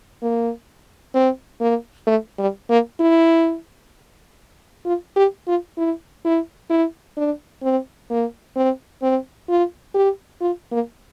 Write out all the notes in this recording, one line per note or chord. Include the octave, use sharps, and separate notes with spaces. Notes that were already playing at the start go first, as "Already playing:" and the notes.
A#3
C4
A#3
A3
G3
A#3
E4
F4
G4
F4
E4
E4
E4
D4
C4
A#3
C4
C4
F4
G4
F4
A#3